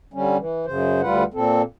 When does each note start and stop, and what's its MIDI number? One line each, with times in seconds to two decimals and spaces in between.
0.14 0.37 50
0.14 0.37 55
0.14 0.37 61
0.38 0.66 52
0.66 1.01 42
0.66 1.01 49
0.66 1.01 72
1.02 1.24 38
1.02 1.24 55
1.02 1.24 65
1.02 1.24 71
1.02 1.24 78
1.34 1.62 46
1.34 1.62 60
1.34 1.62 69